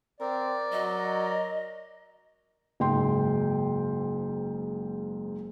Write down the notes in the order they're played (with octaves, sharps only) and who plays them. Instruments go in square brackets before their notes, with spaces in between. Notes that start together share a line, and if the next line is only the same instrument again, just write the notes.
[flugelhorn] C4 [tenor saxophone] A#4 [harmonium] D5
[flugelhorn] F#3 [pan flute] D#5
[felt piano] F#1 G#2 G5 C6